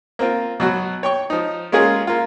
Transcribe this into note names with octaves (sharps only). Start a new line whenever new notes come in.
A#3 C4 F4
B2 F#3 F#4
C#5 G5 C#6
F3 D#4
G#3 A#3 C#4 F4 G#4 A#4
A#3 F4